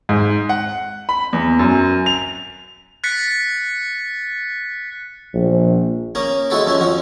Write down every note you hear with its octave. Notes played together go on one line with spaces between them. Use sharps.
G#2
F#5
B5
E2
F#2
F7
F#6 A6 B6 C#7
A#1
A#3 C#4 A#4 D#6
G#3 E4 F#4 A4 B4
F#2 F3 C#4 E4
F2 F3 F#4